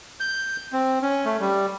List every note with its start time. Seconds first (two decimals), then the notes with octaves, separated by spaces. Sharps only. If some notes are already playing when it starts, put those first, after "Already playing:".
0.20 G6
0.72 C4
1.02 C#4
1.25 A3
1.40 G3